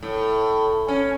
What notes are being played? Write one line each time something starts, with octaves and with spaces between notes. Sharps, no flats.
A2
C#4